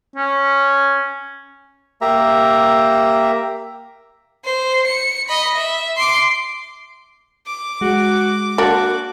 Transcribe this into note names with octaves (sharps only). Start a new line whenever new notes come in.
C#4
A#3 G4 E5 A#5
C5
C#7
D#5 B5
E5
C6 D6
D6
G#3 F#4
A#3 D4 F#4